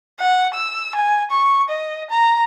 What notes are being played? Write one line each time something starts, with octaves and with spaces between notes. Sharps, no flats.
F#5
E6
G#5
C#6
D#5
A#5